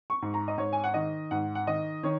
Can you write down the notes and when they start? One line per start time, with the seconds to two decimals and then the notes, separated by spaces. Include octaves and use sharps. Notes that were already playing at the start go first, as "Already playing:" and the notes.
0.10 C#6
0.22 G#2
0.34 A#5
0.48 D#5
0.58 G#2 C#5
0.73 G#5
0.84 F#5
0.94 D#3 D#5
1.31 G#2 F#5
1.55 F#5
1.67 D#3 D#5
2.03 D#3 C#5